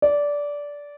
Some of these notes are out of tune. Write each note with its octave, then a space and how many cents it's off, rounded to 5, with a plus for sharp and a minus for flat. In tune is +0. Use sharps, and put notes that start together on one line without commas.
D5 -15